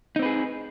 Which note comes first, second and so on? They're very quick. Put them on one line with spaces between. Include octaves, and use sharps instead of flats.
D#4 C4 B4 G#4